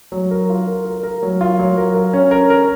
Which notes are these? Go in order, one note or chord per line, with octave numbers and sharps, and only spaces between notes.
F#3
A#4
F4
A#4
A#4
A#4
F#3
F4
F#3
A#4
A#4
C#4
A#4
A#4